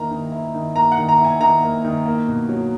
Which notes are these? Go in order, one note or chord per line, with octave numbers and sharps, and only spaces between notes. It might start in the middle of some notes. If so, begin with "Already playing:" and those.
Already playing: D#3 A#3 E4 A#5
D#3
E4
D#3
A#3 A#5
F#5
D#3
A#5
E4
G#5
D#3 A#5
A#3
D#3
A#3
B2
F#3